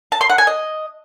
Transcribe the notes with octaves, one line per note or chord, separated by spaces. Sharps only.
A5
C6
F#5
G#5
D#5